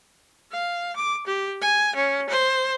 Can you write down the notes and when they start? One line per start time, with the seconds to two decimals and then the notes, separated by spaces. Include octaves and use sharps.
0.51 F5
0.96 D6
1.26 G4
1.61 G#5
1.95 C#4
2.29 C5